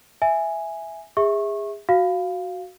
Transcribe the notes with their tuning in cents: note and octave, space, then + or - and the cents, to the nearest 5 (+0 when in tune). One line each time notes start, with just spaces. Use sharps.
E5 +0 G#5 +0
G#4 -25 E5 -15 C#6 -25
F#4 +0 F5 +0